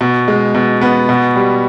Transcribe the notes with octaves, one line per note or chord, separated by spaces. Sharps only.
B2
G#3
B2
B3
B2
G3